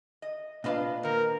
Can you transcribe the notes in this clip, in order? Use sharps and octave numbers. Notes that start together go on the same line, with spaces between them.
D#5
A#2 D4 F4 B4 D#5 F5
D#3 A#3 A#4